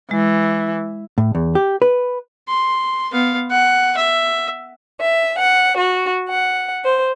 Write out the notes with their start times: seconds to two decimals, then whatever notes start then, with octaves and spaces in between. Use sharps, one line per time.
0.11 E3 G#3
1.18 A2
1.35 E2
1.55 G4
1.82 B4
2.48 C6
3.12 B3 F5
3.51 F#5
3.97 E5
5.01 E5
5.38 F#5
5.76 F#4
6.28 F#5
6.84 C5